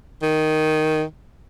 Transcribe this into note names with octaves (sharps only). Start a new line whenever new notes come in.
D#3